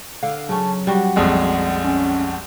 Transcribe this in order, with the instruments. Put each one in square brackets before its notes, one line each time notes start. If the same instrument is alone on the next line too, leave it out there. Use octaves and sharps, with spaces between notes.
[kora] D3 [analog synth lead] F5
[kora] C#3 C#4 [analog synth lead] F#3 [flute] A5
[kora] G3 F#4 [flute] F#5
[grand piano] A#1 F2 G#3
[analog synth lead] C#4